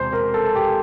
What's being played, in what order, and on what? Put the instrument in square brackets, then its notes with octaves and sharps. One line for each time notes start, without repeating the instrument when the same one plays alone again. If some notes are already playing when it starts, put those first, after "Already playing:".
Already playing: [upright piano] E1 E2 C3 C5
A#4
A4
G4